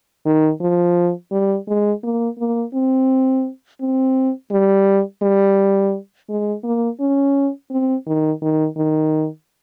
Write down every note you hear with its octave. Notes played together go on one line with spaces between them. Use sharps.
D#3
F3
G3
G#3
A#3
A#3
C4
C4
G3
G3
G#3
A#3
C#4
C4
D#3
D#3
D#3